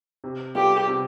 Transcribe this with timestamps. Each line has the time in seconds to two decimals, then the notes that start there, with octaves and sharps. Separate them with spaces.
0.24 C3
0.55 G3 B3 F4 G4 A4
0.87 C3